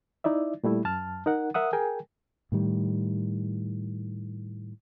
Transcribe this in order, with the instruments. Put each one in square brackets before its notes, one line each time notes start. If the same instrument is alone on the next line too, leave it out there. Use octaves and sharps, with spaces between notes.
[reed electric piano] D#4 E4 D5 E5
A#2 G3 A3 E4
F#2 A5 F6
D#4 A#4 F#5
A#4 E5 F#5 D#6
G#4 A#4 G5 G#5
[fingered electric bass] A2 D#3 G3